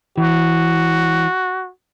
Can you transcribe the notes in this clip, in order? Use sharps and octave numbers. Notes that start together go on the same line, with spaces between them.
E3 F#4